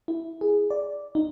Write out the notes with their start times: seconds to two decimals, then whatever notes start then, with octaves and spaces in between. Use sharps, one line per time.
0.08 E4
0.41 G#4
0.70 D5
1.15 D#4